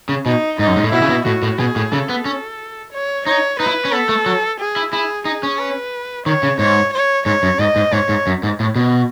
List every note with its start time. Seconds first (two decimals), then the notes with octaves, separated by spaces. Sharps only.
0.09 C#3
0.26 B2 D#4
0.59 G#2 D#4
0.67 F#2
0.76 G#2
0.83 A2
0.92 B2 E4
1.02 C#3
1.10 B2
1.25 A2 F#4
1.43 A2
1.59 B2 G#4
1.76 A2
1.92 C#3 A4
2.09 B3
2.25 C#4
2.92 C#5
3.26 D#4 C#5
3.60 D#4 B4
3.67 E4
3.85 C#4
3.92 B3 A4
4.09 A3
4.26 F#3
4.60 G#4
4.76 E4
4.92 E4 G#4
5.25 D#4 G#4
5.43 C#4
5.59 B4
6.26 D#3 C#5
6.43 C#3
6.59 G#2 C#5
6.93 C#5
7.26 G#2 C#5
7.43 F#2
7.59 G#2 D#5
7.76 G#2
7.93 G#2 C#5
8.09 G#2
8.27 F#2
8.43 G#2
8.60 A2
8.76 B2